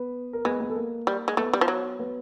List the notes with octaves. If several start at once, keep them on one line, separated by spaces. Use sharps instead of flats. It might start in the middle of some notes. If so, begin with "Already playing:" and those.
Already playing: B3 B4
A#4
G#3 B3 B4
B3 B4
A4
A#3 A#4
G3
G#3
A3 B3 B4
G3
F3
F#3
B3 B4